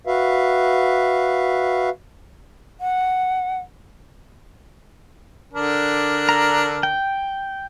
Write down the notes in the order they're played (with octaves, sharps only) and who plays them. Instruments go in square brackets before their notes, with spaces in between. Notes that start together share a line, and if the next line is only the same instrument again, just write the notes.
[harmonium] F#4 B4 E5 F5
[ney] F#5
[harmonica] D3 D4 A#4
[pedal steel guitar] A#5
G5